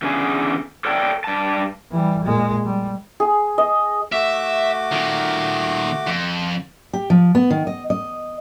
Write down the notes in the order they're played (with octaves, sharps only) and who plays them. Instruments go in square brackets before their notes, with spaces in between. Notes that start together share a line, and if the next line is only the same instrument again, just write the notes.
[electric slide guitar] E2 D3 C#4 G#4 G#5
A4 A#4 C#5 D5 G5 A5
G2 A5
[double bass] E3 G3
A#2 G#3
G3
[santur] G#4
D#5
[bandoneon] A3 F#4 D6 [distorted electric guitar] E5
[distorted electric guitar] A#2 D#3
F2
[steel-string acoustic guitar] G4
F3
B3
D#3
D#5
D#5